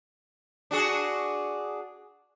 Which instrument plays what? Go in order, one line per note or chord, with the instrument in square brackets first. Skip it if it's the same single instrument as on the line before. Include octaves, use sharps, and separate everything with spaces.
[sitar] D4 F#4 G#4